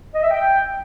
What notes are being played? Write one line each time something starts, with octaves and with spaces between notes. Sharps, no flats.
D#5
E5
G5